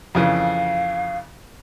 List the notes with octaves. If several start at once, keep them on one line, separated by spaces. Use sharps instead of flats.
F2 C#3 E3 F5